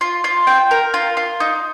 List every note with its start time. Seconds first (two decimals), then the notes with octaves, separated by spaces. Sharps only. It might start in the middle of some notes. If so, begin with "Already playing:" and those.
0.01 F4
0.24 F4
0.47 G5
0.71 A#4
0.94 F4
1.17 F4
1.40 D#4